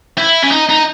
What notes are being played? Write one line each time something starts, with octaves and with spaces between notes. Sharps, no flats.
E4
C#4
D#4
D#4